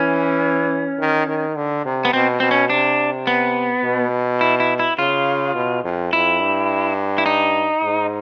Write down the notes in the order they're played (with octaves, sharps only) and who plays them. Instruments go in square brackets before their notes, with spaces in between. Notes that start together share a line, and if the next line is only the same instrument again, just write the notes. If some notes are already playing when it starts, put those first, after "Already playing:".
Already playing: [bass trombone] E3 [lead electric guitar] C#4
[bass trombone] D#3
D#3
D3
C3
[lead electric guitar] B3
[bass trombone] B2 [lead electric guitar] C4
[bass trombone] B2 [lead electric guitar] C4
[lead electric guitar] C#4
[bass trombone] C3 [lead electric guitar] D4
[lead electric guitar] B3
[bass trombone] B2
[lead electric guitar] E4
E4
E4
[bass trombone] C#3 [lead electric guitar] F4
[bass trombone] B2
F2
[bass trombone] F2 [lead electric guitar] E4
[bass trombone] G2
[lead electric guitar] E4
D#4
[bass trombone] G#2